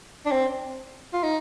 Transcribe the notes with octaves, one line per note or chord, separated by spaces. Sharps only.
D4
C4
F4
D#4